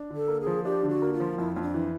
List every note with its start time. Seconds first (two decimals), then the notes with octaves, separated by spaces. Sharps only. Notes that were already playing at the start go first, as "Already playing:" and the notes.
Already playing: D4
0.10 D3
0.16 A4
0.28 A#3
0.41 G#4
0.47 F3
0.64 D4 G4
0.83 D3
0.89 F#4
1.02 A#3
1.13 F4
1.20 F3
1.38 F2 E4
1.55 F2 D#4
1.62 D4
1.74 E3